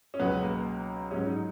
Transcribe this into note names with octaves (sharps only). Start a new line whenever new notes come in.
C#4
C#2 B2 F#3 B3
A#3
G#2 F#3 C#4
D#4